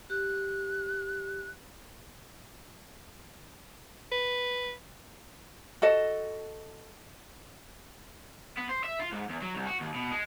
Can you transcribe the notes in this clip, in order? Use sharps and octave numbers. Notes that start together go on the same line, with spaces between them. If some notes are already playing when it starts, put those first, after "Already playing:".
G4 F#6
B4
F#4 A4 D#5
B3
C5
E5
F4
G#2
E2
F#3
C2
F#4
D#2
B2
G#3